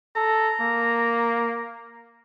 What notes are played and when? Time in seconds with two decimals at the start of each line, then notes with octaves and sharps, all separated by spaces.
0.16 A4 A#5
0.61 A#3